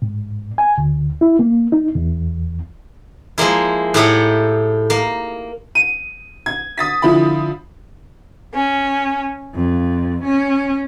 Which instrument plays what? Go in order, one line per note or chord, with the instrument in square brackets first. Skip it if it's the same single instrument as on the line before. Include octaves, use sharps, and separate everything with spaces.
[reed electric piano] G#2
G#5
D2
E4
A#3
D#4
E2
[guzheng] F3 G#3 A#3 E4
A2 D#4 E4 G4 A4 F#5
A#3
[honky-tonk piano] D#7
G#6
D#6 A6 B6
D3 F3 E4 B5
[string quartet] C#4
F2
C#4